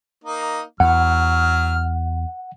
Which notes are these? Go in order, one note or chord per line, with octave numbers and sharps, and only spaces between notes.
A#3 D#4
E2 F#3 F#5 F6